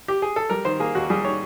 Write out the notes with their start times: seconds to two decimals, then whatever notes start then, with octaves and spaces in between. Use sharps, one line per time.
0.08 G4
0.22 G#4
0.36 A4
0.50 G3 A#4
0.65 D#3 C5
0.80 A#3 G#4
0.95 D#2 F#4
1.10 G3 G#4
1.25 D#3 C#5